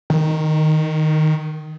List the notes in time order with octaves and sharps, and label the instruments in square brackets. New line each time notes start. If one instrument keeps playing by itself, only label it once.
[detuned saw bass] D#3